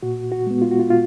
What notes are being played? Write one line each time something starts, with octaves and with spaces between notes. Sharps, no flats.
A#2 F#4
F#4
G#3 B3
F4
F#4
F4
A#2 F4